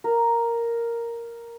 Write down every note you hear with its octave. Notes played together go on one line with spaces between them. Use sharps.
A#4